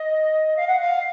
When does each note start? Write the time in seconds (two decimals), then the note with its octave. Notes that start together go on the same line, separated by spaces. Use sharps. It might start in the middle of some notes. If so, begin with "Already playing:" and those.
Already playing: D#5
0.56 F5
0.67 F#5
0.80 F5